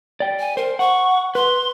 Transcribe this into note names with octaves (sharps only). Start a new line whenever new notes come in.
D5 G5
G#5
A#4 C5
F#5 C#6
B4 C6